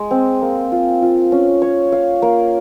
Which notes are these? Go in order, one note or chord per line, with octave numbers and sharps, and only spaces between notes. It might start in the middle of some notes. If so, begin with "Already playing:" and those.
Already playing: G#3
C4
A#3
F4
F4
C#4
C#5
F5
A#3